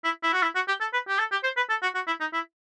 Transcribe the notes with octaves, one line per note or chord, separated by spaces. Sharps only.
E4
E4
F#4
E4
F#4
G4
A4
B4
G4
A4
G4
C5
B4
A4
F#4
F#4
E4
D#4
E4